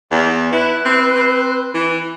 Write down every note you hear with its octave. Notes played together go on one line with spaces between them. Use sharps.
E2
E4 B4 F#6
C4
C4
E3